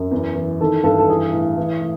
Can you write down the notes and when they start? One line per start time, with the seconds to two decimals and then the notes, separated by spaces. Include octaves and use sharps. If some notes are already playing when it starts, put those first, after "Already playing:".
Already playing: F#2
0.11 E2
0.35 E3
0.60 D#3 A4
0.84 G2 A4
0.99 A4
1.08 E3 G#4
1.32 A2
1.57 E3
1.81 A2